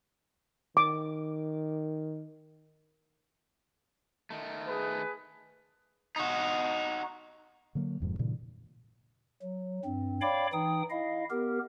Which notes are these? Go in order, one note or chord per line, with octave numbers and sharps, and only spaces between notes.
D#3 D6
D#3 A3
G#4 B4
D#4 F#4
D3 F#3 A#3
E1 F2 G#2
G2 A#2 C#3 E3
F#3
G2 C4
C#5 D5 F5 G5 B5 D6
E3 D#4 G5 D#6
E4 D#5 F5
B3 G4 A#4